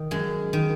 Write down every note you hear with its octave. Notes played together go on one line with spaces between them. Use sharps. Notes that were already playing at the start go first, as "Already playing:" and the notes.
Already playing: D#3
F#2 G#3
D#3